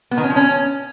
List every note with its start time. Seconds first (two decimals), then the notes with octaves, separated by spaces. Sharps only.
0.11 B3
0.18 D#3
0.24 C#4
0.30 F3
0.36 C#4